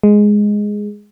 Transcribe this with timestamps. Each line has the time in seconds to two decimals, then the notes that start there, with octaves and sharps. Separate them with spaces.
0.03 G#3